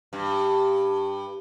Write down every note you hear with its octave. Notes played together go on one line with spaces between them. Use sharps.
G2